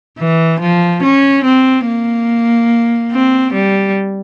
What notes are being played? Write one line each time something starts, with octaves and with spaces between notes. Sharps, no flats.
E3
F3
C#4
C4
A#3
C4
G3